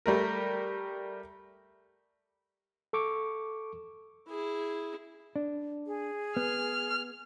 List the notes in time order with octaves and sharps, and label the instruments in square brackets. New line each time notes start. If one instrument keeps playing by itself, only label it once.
[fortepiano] G3 A3 A#4
[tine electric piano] A4 C#6 D6
[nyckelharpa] E4 G#4
[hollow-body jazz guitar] D4
[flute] G#4
[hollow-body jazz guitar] B3 [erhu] F6